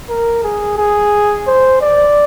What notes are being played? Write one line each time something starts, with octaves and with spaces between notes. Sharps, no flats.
A#4
G#4
G#4
C5
D5